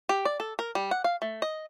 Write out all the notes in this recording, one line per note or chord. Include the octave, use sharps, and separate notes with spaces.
G4
D5
A4
A#4
G3
F#5
F5
A3
D#5